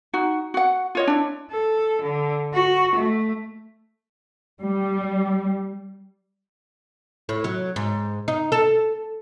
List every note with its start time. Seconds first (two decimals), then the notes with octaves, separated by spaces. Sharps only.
0.13 D#4 F#4
0.54 F#4 F#5
0.95 F4 C#5 D#5
1.07 D4 E4
1.51 A4
2.02 D3
2.54 F#4
2.96 A3
4.61 G3
7.29 A2
7.44 F#3
7.76 G#2
8.28 D#4
8.52 A4